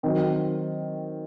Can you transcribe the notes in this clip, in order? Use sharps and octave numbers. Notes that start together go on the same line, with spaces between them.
D#3 F#3 C4